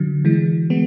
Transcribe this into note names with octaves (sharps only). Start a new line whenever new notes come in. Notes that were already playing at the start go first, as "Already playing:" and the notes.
Already playing: D3 F#3
E3 G#3
G#3 B3